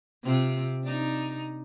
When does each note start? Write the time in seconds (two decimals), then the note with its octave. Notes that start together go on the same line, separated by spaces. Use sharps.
0.23 C3 C4 F4
0.84 D4 D#4